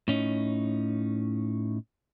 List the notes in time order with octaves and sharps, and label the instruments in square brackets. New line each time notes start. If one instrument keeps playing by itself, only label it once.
[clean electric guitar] A2 C#4 D#4